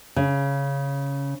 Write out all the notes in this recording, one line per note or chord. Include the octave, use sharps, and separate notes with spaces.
C#3